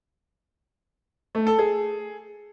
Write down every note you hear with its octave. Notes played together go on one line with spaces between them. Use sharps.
A3
A4
G#4